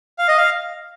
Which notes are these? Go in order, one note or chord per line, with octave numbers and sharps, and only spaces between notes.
F5
D#5
F5